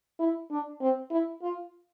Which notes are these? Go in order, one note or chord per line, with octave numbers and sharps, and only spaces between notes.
E4
D4
C4
E4
F4